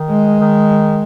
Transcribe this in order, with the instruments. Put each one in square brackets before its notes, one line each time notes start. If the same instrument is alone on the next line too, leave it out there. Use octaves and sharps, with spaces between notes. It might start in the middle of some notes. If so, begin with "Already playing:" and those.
Already playing: [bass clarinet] D#3
[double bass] G#3
[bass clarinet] D#3